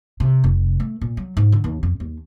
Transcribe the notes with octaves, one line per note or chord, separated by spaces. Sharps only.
C3
F1
A3
A#2
F#3
G#2
D3
D#2
F2
D#2